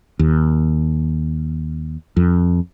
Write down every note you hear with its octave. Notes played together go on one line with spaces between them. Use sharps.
D#2
F2